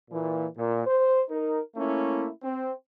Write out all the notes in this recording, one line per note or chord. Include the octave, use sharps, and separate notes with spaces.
A#2 E3
A#2
C5
D#4 A#4
A3 A#3 C#4 E4
C4